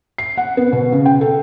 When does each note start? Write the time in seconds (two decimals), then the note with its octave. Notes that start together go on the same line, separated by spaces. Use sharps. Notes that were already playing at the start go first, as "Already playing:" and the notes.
0.18 C7
0.37 F#5
0.57 B3
0.73 B2
0.92 C#3
1.06 G5
1.21 A4